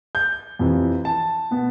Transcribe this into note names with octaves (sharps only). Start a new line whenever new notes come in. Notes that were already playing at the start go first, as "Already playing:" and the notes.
G6
F2 C3 E3
A5
B2 B3